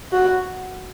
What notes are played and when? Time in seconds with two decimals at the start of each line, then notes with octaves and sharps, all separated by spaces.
0.12 F#4